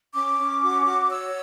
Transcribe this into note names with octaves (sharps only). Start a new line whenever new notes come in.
C#4 D6
C#4
F#4
F#4
C#5 E6